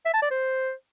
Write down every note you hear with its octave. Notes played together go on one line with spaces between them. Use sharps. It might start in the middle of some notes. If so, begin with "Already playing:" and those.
E5
A5
D5
C5